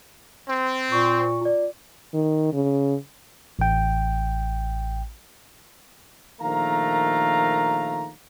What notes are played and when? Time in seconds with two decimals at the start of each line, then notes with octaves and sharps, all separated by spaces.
0.47 C4
0.92 A#2 C#6
1.41 F4 D5
2.14 D#3
2.53 C#3
3.59 A1 G5
6.41 A#1 D#3 A3 F5 A#5